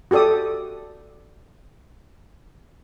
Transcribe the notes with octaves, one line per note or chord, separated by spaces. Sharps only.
F#4 G4 A4 D5 D#6